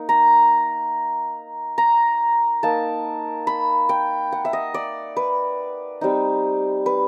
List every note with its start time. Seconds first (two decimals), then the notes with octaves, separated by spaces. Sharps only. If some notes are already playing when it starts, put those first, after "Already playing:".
Already playing: A#3 D#4
0.09 A#5
1.78 A#5
2.63 A#3 D#4 A5
3.47 B5
3.89 G5
4.32 F#5
4.45 E5
4.53 D#5
4.74 D5
5.17 B4
6.01 G3 C4 D#4
6.86 B4